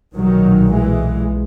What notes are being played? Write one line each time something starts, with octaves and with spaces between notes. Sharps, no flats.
B1 A#2 D#3 F#3
E3 G#3